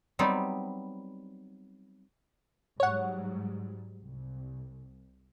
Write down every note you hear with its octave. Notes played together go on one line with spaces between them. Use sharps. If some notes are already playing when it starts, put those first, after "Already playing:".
F#3 G3 B3 C4 D#4
G#2 F#3 G3 C#5 F#5
C2